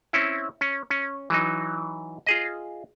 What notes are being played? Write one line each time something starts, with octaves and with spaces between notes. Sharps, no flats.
C4 C#4 E4
C#4
C#4
E3 F#3 D#4
F4 G#4 D#5